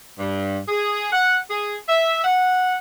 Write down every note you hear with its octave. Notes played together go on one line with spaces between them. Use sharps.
G2
G#4
F#5
G#4
E5
F#5